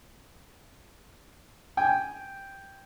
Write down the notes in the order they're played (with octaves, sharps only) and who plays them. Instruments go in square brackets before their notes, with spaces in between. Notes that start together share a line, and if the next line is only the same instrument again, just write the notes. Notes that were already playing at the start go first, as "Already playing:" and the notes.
[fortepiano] G5 G#5